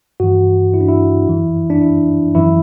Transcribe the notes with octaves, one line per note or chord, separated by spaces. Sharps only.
G2 E3 F#4
E4
D4
E4
F#2 E3
D4
E4
F#2 E3 E4